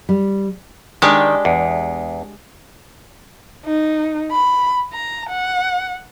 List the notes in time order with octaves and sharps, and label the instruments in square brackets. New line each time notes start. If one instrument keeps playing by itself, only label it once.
[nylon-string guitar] G3
[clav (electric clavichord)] D#3 [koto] G#3 D4 G4
[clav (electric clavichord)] E2
[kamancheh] D#4
B5
A#5
F#5